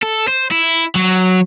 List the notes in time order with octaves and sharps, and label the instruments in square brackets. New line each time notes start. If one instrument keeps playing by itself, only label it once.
[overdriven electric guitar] A4
C5
E4
F#3